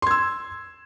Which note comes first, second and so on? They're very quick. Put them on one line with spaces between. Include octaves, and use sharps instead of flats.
C6 G#6 E6